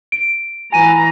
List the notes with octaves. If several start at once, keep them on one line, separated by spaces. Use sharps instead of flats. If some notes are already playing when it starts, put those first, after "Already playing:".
D7
E3 G#5 A#5 D#7